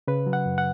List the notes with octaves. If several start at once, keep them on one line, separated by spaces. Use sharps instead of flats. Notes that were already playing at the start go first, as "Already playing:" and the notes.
C#3 B4
F#3
F#5
F#2
F#5